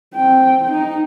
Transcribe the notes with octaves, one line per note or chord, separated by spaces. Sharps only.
C4 G5
D#4